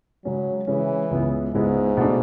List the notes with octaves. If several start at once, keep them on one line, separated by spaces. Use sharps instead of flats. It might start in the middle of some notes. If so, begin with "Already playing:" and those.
C#3 F#3 G#3 C#4
C#3 E3 G#3 C#4
C#2 C#3 G#3 B3 E4
C#2 G#2 C#3 G#3 B3 E4
B2 A3 D4